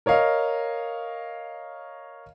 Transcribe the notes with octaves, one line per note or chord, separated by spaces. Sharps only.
A#4 C#5 D#5 F5